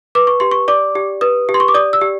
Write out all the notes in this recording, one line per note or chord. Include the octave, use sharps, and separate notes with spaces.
B4 D6
C#6
G4 C6
C#6
D5 D6
G4
B4 D#6
G4
C6
C#6
D6
D5 D#6
E6
G4